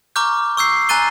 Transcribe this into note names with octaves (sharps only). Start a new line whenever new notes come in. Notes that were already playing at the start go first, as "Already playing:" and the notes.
A#5 C#6 D6 F6 G6
C#6 E6 G6 C7
G#5 A#5 F#6 A6 D#7 G7